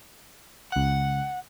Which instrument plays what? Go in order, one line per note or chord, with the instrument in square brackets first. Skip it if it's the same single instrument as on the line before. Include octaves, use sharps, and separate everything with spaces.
[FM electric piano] C#2 F#6 [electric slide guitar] F#5